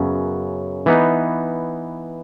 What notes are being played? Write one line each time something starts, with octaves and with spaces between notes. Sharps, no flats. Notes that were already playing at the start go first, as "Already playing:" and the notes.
Already playing: F#2 C#3 F#3 B3
E3 B3 D#4